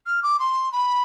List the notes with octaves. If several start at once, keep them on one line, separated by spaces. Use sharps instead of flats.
F6
D6
C6
B5